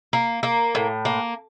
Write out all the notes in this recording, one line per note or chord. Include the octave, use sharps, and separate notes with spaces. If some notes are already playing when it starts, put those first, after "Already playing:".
A#3
A#3
A2
A#3